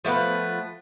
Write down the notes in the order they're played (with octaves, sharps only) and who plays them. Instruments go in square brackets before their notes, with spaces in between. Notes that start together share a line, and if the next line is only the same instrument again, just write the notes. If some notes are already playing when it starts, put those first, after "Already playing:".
[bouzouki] F3 A3 B3 B4